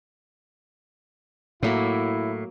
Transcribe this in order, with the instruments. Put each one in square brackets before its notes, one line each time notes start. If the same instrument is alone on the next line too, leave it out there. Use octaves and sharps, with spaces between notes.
[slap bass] A2 [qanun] F#3 A#3 B5 [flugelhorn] E4